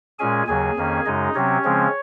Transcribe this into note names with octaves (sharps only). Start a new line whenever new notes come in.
A#2 G#3 C#4 G#4 G#5
D#2 C#3 F#3 G#4 G#5
F2 D#3 A#3 C#4
F#2 C#3 G#3 D#4 D#5
C3 F#3 C4 C#4 C#5
C#3 F3 G#3 C4